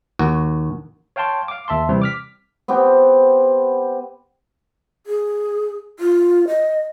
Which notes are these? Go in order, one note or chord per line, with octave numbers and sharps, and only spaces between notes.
D#2 F#4
C#5 F5 G5 A5 C6
F5 D6
D#2 E5 A5 C6
C3 E3 G3 C4
D6 F6 B6
B3 C4 G4
G#4
F4
D#5